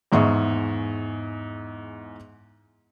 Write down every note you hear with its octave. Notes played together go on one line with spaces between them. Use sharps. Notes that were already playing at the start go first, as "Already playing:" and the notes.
E2 G#2 G#4 E5 C#6